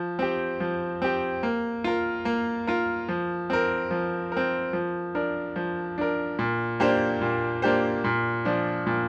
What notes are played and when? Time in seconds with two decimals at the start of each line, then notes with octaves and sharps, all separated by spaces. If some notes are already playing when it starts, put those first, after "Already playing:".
Already playing: F3
0.19 C4 G4
0.60 F3
1.02 C4 G4
1.43 A#3
1.84 F4 A#4
2.25 A#3
2.67 F4 A#4
3.09 F3
3.50 C4 A#4
3.91 F3
4.32 C4 A#4
4.73 F3
5.15 D4 A#4
5.56 F3
5.98 D4 A#4
6.39 A#2
6.80 A#3 D4 G4 C5
7.21 A#2
7.62 A#3 D4 G4 C5
8.04 A#2
8.45 F3 D4
8.87 A#2